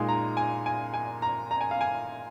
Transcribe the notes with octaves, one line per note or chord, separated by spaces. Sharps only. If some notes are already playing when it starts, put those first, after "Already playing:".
Already playing: A#2 G#3 D#4 G#5
A#5
G#5
G#5
G#5
A#5
A#5
G#5
F5
G#5